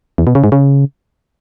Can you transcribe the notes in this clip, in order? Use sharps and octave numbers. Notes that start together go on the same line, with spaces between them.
E2
B2
C#3
G#2
C#3